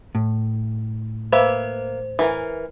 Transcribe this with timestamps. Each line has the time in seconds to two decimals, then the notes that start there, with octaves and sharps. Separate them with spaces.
0.15 A2
1.32 A#3 B4 C5 E5
2.19 E3 A#4 G#5